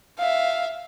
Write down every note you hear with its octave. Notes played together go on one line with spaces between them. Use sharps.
E5 F5